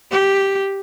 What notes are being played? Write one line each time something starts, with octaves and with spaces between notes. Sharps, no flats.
G4